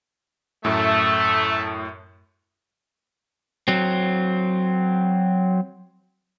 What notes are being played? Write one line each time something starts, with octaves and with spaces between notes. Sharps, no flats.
F#2 A2 A3 E5 A5
F#3 C4